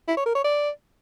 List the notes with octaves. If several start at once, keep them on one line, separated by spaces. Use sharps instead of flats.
E4
C#5
A#4
C#5
D5